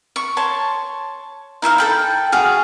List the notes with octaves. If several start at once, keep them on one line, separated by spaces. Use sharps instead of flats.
C#6
C#5 A5 C6
D#4 E4 E5 F5
A4 G5 B5
F#4 G#4 F5